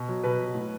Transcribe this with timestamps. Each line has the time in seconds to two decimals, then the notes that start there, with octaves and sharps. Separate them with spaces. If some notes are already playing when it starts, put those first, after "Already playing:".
Already playing: B2
0.09 F#3
0.23 B2 B4
0.39 F#3
0.55 A2